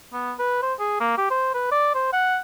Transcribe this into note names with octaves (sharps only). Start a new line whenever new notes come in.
B3
B4
C5
G#4
A#3
G4
C5
B4
D5
C5
F#5